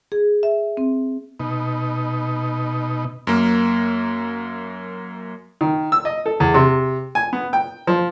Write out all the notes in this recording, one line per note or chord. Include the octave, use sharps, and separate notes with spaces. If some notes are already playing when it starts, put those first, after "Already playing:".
G#4
E5
C4
B2 D#4
F#2 A#3
D#3
E6
D#5
A4
E2
C3
G#5
B3
G5
F3